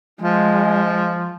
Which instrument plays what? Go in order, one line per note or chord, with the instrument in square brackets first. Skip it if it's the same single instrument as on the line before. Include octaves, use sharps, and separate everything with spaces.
[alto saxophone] F3 [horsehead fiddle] G#3